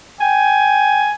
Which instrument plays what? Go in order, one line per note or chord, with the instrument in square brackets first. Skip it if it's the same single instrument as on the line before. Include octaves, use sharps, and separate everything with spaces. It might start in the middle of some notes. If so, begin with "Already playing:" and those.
[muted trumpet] G5 [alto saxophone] G#5